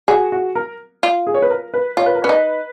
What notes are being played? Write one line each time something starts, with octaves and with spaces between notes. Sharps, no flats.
F#4 G#4
F#4
A#4
F4
G#4
C#5
B4
A#4
B4
F4 C#5
B4
A#4
C#4 B4
D#4